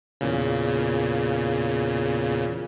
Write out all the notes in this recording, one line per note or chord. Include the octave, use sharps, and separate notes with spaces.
E2 A#2 C#3